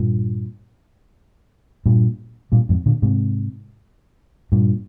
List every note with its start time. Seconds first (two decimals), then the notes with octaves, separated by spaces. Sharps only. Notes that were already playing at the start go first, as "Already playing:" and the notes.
Already playing: G2 A#2
1.86 G2 A#2
2.52 G2 A#2
2.69 F2 G#2
2.86 A#2 D3
3.02 G#2 C3
4.52 G2 A#2